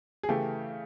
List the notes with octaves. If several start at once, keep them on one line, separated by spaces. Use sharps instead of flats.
G#4
C#3 E3 A3 G4